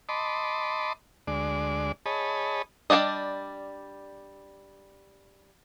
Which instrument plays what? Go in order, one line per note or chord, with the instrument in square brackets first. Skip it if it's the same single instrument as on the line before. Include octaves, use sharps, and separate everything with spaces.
[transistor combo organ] D#5 A5 B5 C6 D6
D2 G#3 D5
G#4 C#5 D#5 A5 B5
[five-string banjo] G3 D4 F#4 D5 D#5